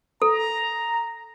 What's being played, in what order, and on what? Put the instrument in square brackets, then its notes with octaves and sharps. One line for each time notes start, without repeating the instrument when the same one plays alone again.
[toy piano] A4 [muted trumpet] A#5